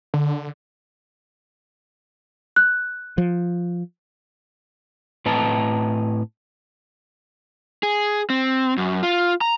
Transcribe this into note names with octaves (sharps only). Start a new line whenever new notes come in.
D3
F#6
F3
A2 C4 B4 D#5 A5 A#5
G#4
C4
F#2
F4
A#5